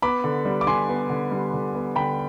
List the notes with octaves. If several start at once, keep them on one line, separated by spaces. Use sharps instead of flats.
B3 B5 D6
D3
G3
D6
D3 G#5 C6
B3
D3
G3
D3
B3
D3 G5 B5